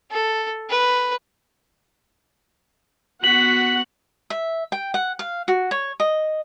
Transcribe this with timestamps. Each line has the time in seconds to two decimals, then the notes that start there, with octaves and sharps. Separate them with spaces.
0.11 A4
0.70 B4
3.24 B3 F#4 F#5 B6 F#7
4.30 E5
4.72 G5
4.94 F#5
5.19 F5
5.48 F#4
5.71 C#5
6.00 D#5